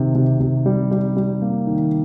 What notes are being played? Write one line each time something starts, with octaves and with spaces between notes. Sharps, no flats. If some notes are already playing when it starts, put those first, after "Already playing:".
Already playing: C3 D#3
C3
C3
G3
G3
G3
A#3
D#3